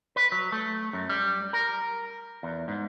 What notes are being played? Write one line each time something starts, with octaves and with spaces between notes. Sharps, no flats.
B4
F#3
A3
F#2
G3
A#4
E2
G#2